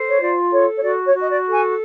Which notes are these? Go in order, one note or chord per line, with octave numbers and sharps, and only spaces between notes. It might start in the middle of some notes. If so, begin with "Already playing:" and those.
Already playing: A4 C5
C#5
F4 D5
A4 C#5
C#5
F#4 D5
C#5
F#4
D#5
D5
A4
G#5